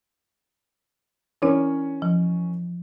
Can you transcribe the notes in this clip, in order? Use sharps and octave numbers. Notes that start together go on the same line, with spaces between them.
E3 C#4 D4 E4 A#4 C#5
F3